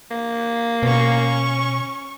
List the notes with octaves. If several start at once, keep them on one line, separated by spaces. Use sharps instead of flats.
A#3
B2 C#4 C#6